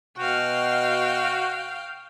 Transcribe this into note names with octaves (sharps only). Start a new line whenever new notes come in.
B2 F#4 F5 G5